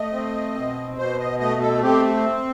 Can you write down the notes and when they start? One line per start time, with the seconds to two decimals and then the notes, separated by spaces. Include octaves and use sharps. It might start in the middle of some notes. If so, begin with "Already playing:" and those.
Already playing: A3 D#5
0.13 C4
0.56 B2
0.97 B2 C5
1.19 D#5
1.39 A3 D#5
1.61 A4
1.82 C4 G4